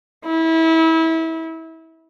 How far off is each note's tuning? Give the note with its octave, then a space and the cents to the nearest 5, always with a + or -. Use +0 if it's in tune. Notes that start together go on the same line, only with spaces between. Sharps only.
E4 -25